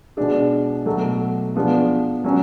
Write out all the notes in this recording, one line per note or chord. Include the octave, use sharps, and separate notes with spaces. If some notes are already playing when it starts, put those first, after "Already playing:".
B2 G#3 D4 G#4
B2 F#3 A3
F3 B3 D4 G#4
F#3 C#4